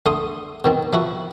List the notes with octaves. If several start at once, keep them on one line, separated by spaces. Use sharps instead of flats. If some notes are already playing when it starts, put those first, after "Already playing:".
D3 A3 C6 D#6
B2 D#3 C4
F3 E4 F#4